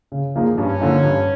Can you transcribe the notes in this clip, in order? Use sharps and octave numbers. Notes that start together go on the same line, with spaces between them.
C#3
F3 A#3 D#4 G#4
G2 C#4
D3 F3 A#3 D#4
G2